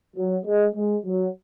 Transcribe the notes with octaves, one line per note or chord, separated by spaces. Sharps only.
F#3
G#3
G#3
F#3